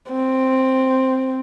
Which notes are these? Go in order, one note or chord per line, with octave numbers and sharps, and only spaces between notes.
C4